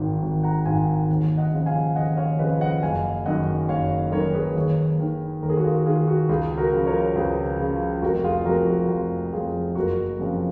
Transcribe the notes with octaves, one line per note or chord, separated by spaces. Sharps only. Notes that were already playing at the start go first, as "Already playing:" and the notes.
Already playing: G#1 G#2 D#3
G#1
F#5 A#5
G#2 D#3 F5 G#5
D#2
D#5 F#5
C#3 F3
F5 G#5
D#2 D#5 F#5
C#5 F5
C#3 F3 B4 D#5
D#5 F#5
F#1 F5 G#5
F#2 D#3 D#5 F#5
F#1 C#5 F5
F#2 D#3 A#4 C#5
G#4 B4
D#2
D#3
D#2 A#4
G#4
F#4 A#4
F4 G#4
D#3 F4 G#4
F#4
C#2 F4 G#4
F#4 A#4
C#3 F3
A#4 C#5
C#2 G#4 B4
C#3 F3
F1 F#4 A#4
F4 G#4
F2 F3 F#4 A#4
F#4
F1 F4
F2 F3 F4 G#4
F#1 F#4 A#4
F2 C#3 F3